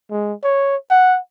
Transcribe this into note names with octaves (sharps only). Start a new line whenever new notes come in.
G#3
C#5
F#5